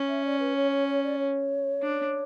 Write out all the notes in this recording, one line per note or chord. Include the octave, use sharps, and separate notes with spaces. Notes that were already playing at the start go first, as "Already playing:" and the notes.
Already playing: C#4
E5
D5
B4
C#5
C#5
C#5
D5
C#5
D4